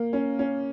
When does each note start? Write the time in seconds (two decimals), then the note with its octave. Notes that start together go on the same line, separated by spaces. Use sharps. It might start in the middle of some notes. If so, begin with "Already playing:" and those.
Already playing: A#3
0.13 C#4
0.39 C#4